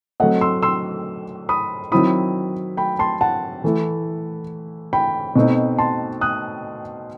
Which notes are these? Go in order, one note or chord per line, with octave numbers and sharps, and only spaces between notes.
F#3 A3 C4 D#5 F#5
C6 E6
C6 E6
B5 D#6
D#3 F#3 C4 E4 B5 D#6
G5 B5
A5 C6
F#5 A5
E3 A3 E4
G5 B5
B2 A3 C4 D#4
A5 C6
D#6 F#6